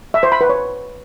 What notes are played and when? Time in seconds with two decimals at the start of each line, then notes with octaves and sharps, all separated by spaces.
0.14 E5
0.23 C5
0.32 B5
0.41 B4
0.49 C#5